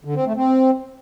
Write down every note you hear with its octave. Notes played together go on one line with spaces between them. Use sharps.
D3
C4
A3
C4